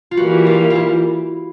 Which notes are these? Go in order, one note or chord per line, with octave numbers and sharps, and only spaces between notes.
F4
E3 G3 A#3 F#4
F4
F4
E4